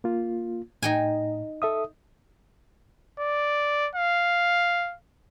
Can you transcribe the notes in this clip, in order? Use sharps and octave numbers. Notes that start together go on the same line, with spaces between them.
A#3 F4
A2 D#4 G5 G#5
A4 E5 D#6
D5
F5